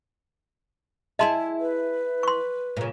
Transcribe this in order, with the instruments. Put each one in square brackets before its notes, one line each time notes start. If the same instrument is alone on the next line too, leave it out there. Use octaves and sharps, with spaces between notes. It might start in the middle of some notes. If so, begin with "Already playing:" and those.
[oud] E4 G#4 E5 [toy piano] D#5 A5 C6
[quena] B4
[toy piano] C6 C#6
[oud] A#2 C#3